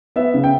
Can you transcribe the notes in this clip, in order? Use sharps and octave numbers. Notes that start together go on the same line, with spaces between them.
B3 E5
C#3
G5